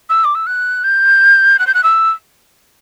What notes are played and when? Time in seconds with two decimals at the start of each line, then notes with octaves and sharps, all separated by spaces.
0.10 E6
0.24 D6
0.35 E6
0.47 F#6
0.84 G6
1.59 F#6
1.67 G6
1.74 F#6
1.84 E6